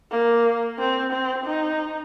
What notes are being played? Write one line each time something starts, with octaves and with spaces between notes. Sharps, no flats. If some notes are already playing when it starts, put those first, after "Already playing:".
A#3
C4
C4
D#4